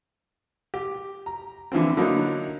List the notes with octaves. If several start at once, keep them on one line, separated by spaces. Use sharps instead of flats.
G4
A#5
D3 E3 F3 C4
D3 F#3 A#3 D#4 E4